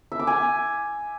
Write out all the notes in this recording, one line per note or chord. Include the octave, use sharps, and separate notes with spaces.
E5
D6
G#5